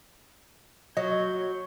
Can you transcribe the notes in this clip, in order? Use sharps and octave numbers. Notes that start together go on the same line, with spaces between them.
F#3 D#5 C#6 G6 G#6